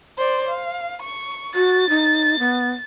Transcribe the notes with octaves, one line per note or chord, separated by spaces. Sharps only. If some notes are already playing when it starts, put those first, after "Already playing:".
C5 D5
F5
C#6
F#4 A6
D#4
B3